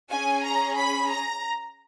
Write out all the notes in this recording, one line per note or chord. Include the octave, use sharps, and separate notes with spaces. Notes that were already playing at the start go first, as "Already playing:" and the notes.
C#4 G#4 G#5
A#5
B5
A#5